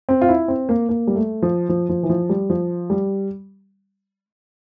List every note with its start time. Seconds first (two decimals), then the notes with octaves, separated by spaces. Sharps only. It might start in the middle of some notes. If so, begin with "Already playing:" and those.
0.09 C4
0.22 F4
0.29 E4
0.48 C4
0.69 A#3
0.89 A#3
1.07 G3
1.15 A3
1.42 F3
1.69 F3
1.89 F3
2.03 E3
2.09 F3
2.29 G3
2.50 F3
2.90 G3